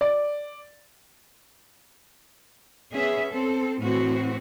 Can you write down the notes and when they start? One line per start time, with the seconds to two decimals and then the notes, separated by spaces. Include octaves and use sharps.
0.01 D5
2.92 B3 C#4 G#4 E5
3.31 C4 A4
3.80 A2 E3 C4 F#4